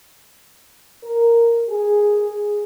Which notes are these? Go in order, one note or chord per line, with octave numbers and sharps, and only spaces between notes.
A#4
G#4